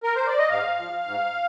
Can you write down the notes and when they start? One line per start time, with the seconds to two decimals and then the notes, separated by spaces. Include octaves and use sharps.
0.03 A#4
0.15 C5
0.27 D5
0.38 D#5
0.50 G#2 F5
0.78 F3
1.06 G#2